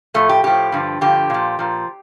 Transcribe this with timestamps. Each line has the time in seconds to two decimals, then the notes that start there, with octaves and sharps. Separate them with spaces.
0.14 A2 F3 A3
0.29 G4
0.44 A2 F3 G4
0.72 G2 D3 F3
1.01 G2 D3 F3 G4
1.30 A#2 F3
1.59 A#2 F3